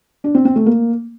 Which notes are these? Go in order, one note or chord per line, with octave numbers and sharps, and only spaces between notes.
D4
C4
C4
A3
A#3